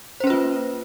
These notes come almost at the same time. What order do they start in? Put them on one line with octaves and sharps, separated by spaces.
C5 C#4 B4 F4 A#3